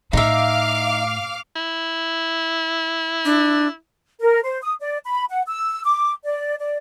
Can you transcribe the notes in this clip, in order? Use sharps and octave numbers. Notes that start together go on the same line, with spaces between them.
A2 D#4 E5 F5 D6 F6
E4
D4
A#4
C5
D#6
D5
B5
F#5
E6
D6
D5
D5